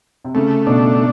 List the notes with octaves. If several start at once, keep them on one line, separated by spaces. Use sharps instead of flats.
C3
C#3 A3
B2 D4